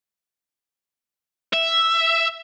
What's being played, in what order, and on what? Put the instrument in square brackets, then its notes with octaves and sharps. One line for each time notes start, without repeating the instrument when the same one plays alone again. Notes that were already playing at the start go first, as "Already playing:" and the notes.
[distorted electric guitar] E5